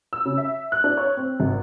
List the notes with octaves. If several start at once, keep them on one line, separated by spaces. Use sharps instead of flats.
E6
C#3
E5
F#6
D4
C#5
C4
G#1